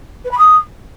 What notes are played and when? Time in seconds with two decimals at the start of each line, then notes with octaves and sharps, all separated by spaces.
0.24 B4
0.31 B5
0.37 D#6